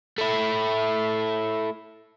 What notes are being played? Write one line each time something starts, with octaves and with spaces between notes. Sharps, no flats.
A3 E4